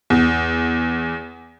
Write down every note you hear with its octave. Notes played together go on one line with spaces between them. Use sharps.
E2